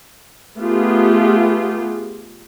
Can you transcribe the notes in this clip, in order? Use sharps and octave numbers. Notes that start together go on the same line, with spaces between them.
A3 B3 F4 G4 G#4